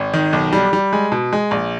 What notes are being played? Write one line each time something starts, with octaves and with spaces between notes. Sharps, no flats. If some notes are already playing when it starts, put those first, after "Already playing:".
Already playing: G#1
D#3
B1
G3
G3
G#3
B2
G#3
A#1